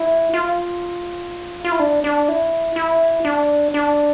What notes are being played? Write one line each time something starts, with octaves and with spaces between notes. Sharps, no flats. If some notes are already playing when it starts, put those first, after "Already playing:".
Already playing: E4
F4
F4
E4
D4
D4
E4
E4
D4
D4